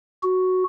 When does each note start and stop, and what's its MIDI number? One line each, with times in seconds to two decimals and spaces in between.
0.23 0.64 66